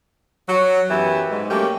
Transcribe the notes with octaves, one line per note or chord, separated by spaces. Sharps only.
F#3 F#4
F#2 E3 B3 G4 E5
G#2
F#3 A3 A#3 C#4 G4